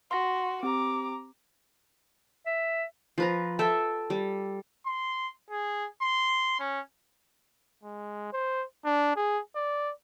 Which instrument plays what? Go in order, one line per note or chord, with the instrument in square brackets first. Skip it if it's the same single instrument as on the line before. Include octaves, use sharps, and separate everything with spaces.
[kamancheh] F#4 [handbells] C6 A#6
[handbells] C4 G4 [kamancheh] A#5 D6
[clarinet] E5
[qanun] F3 B4 A#5
A4 E5 G5
G3
[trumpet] C6
G#4
C6
C#4
[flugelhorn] G#3
C5
D4
G#4
D5